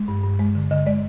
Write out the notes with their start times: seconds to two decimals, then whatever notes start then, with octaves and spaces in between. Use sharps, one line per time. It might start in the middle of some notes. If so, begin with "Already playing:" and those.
Already playing: G#3
0.08 G2
0.24 G2
0.39 G#3
0.55 D3
0.71 D3 D#5
0.86 G#3 D5